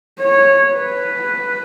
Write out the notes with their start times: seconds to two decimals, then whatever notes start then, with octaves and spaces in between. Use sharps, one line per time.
0.19 C#5
0.75 B4